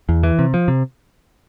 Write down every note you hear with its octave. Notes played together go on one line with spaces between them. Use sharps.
E2
E3
C3
F3
C3